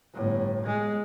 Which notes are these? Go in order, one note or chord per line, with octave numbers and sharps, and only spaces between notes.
G1 A2
G#3